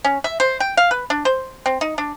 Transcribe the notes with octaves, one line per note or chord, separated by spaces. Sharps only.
C#4
E5
C5
G5
F5
B4
D4
C5
C4
D#4
D4